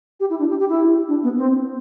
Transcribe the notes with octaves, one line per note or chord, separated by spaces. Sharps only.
G4
E4
D4
G4
G4
E4
D4
B3
C4